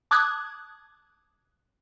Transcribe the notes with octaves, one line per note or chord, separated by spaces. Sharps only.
A5 D6 D#6 F#6 G#6